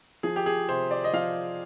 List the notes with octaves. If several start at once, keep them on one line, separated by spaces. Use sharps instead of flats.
F3 G#4
G4
G#4
C3 C5
D5
D#5
F3 F5